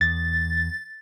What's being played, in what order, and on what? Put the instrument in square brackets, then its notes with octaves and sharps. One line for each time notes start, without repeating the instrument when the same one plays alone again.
[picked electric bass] E2 [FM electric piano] A6